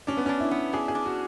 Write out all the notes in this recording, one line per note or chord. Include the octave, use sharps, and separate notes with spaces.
C#4 D4
B3
C#4
D4
E4
B3
D4 G#4
G#4
D4
F#4